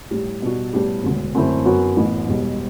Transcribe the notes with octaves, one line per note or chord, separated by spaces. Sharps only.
A2 G3 D4 G4
B2 G3 D4 F#4
A2 G3 B3 D4 G4
E1 D2 D3
F#2 D3 A3 C4 E4
F#2 F#3 B3 F#4
A1 A2 E3 B3
E1 E2 B2 G3